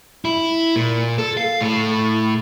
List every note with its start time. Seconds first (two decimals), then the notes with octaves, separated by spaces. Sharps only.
0.25 E4
0.76 A#2
1.18 A4
1.37 F5
1.61 A2 A4